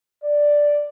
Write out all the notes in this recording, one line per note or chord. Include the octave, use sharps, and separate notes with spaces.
D5